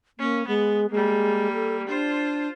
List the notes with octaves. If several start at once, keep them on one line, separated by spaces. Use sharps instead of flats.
A#3 C#4
G#3 B3
G3 G#3 A#3
A4
D4 F4 C5